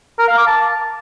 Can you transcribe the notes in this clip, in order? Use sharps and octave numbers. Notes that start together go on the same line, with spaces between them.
A#4
F5
D6
A5